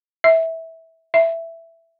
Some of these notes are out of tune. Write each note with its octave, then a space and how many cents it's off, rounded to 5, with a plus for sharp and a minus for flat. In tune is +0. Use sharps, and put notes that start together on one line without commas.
E5 -15
E5 +5